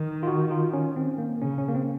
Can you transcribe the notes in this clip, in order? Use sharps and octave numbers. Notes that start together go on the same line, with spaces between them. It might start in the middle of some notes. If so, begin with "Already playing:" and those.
Already playing: D#3
F4
F#4
F4
C#4
C4
A#3
C#3 C#4
C#4
A#3
C4